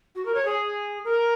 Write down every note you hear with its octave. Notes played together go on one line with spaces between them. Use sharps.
F#4
A#4
C#5
G#4
A#4